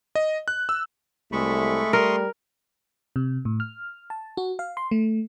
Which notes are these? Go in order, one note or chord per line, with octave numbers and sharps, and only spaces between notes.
D#5
F#6
E6
C2 G#3 A3 B5 C#6
G3 A#4 C6 C#6 D#6
C3
A2
F6
A5
F#4
F5
C6
A3